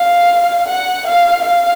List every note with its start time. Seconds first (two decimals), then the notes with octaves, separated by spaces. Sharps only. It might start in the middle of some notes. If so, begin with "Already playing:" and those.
Already playing: F5
0.68 F#5
1.07 F5
1.44 F5